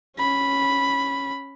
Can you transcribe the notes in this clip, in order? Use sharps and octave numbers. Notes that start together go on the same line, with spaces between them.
C#4 B5